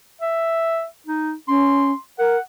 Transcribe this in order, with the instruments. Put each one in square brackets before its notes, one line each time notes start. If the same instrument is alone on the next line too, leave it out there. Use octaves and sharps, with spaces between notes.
[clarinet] E5
D#4
[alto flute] C#4 [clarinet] C6
[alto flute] A#4 [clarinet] F#5